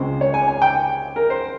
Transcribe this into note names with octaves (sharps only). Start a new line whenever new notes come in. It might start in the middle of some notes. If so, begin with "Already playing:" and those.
Already playing: C#2 C#3 G#3 C4 C5
C#5
G#5
G#5
G5
A#4
C5